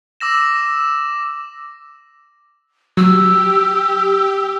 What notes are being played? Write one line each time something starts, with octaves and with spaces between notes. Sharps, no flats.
D6 E6 A#6 E7
F#3 G4 E6